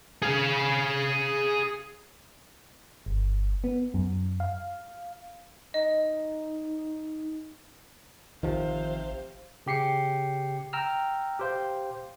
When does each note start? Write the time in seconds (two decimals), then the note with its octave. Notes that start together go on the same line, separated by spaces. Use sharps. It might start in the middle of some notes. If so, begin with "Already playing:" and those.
0.23 G#4 F5
3.06 G1
3.64 B3
3.94 F#2
4.40 F5
5.74 D#4 D#5
8.43 A1 C3 D#3 F3 C5 F5
9.66 C#3 G4 C7 C#7
10.73 G5 A#5 E6 F6
11.39 G4 C5 F5